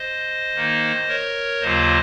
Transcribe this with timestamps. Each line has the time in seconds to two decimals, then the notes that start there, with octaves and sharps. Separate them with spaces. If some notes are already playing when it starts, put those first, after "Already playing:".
Already playing: C5 D#5
0.55 D#3 A#3 D#4
1.08 A#4 C#5
1.61 D#2 C#3 F#3 A#3 F4 C5 D#5